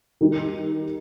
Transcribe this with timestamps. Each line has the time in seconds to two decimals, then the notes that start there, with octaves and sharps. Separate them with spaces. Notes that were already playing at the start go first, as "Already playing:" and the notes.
0.21 D#3 G3 D#4 G4